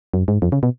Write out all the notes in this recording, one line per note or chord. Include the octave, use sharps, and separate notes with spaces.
F#2
G#2
F2
C#3
B2